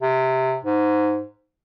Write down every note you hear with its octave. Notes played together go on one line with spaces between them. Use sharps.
C3
G#2